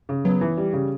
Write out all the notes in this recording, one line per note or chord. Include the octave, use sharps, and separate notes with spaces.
C#3
F#3 B3
E3
G3
C#3